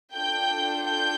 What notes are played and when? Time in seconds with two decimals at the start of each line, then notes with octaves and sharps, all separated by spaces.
0.15 D4 F4 A4 G5 G6
0.86 G5 G6